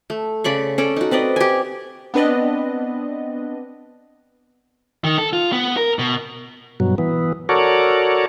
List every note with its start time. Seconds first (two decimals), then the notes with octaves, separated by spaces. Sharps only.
0.10 A3
0.44 C#3 D5 B5 C#6
0.78 C#4 A4 D5
0.96 D#4 F#4
1.11 C4 B4 D5 D#5
1.36 G4 G#5
2.14 B3 C4 D4 B4 D5 D#5
5.04 D#3
5.18 A4
5.33 F4
5.52 B3
5.77 A#4
5.99 B2
6.80 G2 B2 F#3
6.98 E3 B3
7.49 F#4 A4 A#4 C#5 D5